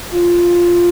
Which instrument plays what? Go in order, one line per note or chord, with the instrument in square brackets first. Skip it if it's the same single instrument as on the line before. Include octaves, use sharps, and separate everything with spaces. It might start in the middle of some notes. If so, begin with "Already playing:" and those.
[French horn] F4